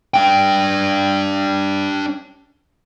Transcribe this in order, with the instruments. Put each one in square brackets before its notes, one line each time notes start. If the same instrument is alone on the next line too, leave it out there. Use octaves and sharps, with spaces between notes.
[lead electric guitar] D4 G5